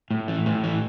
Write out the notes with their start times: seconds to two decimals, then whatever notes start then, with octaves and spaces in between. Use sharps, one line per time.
0.11 A2
0.28 E3
0.46 A2
0.64 E3